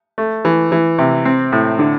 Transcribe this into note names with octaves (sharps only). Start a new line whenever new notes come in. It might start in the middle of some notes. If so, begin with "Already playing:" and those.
A3
E3
E3
C3
C4
A2
D3